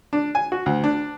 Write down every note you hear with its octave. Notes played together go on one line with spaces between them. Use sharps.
D4
G#5
F#4
D2
D4